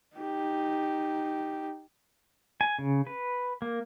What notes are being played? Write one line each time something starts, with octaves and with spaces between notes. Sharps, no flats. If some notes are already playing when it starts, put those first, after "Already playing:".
D#4 G4
G#5
C#3
B4
A#3